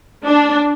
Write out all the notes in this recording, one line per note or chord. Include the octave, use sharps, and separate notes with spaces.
D4